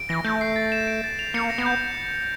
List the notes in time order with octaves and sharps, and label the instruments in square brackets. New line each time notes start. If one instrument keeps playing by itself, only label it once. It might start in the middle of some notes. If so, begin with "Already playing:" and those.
Already playing: [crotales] D7
[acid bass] E3 [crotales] A#6
[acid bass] A3 [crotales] G6
[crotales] C7
A6
E7
D7
A6
F7
[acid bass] A#3 [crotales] C#7
[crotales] A#6
[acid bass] B3
[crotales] G6